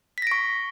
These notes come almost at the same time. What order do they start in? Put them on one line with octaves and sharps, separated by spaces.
B6 A#6 D7 C#6